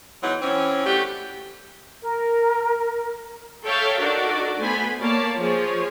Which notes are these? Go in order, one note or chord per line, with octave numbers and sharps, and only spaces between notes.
E3 F#3 G#3 B3 D#4
E3 C4 C#4
A3 D4 F#4 G4
A#4
A4 C#5 E5 F5 G5 A5
D4 D#4 F#4 A4 A#4 D5
A3 B3 C5 G#5 B5 C6
A#3 C#5 D5 A5
F3 G#4 C#5